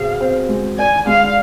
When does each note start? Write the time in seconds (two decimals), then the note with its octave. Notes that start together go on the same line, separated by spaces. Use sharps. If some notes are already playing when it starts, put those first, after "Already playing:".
Already playing: B2 C4 G#4 F5
0.21 C4
0.49 G#3
0.78 D5 G#5
1.07 G#3 F5